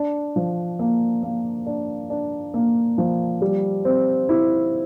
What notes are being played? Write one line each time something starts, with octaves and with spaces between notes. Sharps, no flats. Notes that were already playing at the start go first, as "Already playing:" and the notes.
Already playing: D4
F3
A#3
A#3
D4
D4
A#3
F3
G3
C4
E4